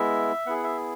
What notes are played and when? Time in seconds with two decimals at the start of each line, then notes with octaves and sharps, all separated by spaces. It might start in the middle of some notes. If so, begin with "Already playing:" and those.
Already playing: G#3 B3 E4 E5
0.46 B3 E4 G#4 F#5
0.64 E5